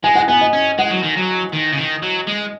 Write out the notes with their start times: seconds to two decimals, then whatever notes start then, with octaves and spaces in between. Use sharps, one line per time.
0.04 G#3 G#5
0.15 F#5
0.28 B3 G#5
0.41 D#5
0.53 C#4
0.78 G#3 F#5
0.91 F#3
1.03 D#3
1.17 F#3
1.53 D#3
1.72 C#3
1.78 D#3
2.03 F#3
2.27 G#3